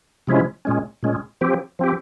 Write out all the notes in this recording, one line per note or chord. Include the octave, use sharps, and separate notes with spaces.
C3 F3 G#3 C#4 E4
A#2 G#3 C#4
A#2 G#3 C#4
F3 C4 G4
F3 C4 G4